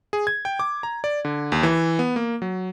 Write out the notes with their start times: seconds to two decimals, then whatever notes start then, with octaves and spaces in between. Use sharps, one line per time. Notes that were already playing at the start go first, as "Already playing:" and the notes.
0.13 G#4
0.27 G#6
0.45 G5
0.59 D6
0.83 A#5
1.04 D5
1.25 D3
1.52 D#2
1.63 E3
1.99 B3
2.16 A#3
2.42 F#3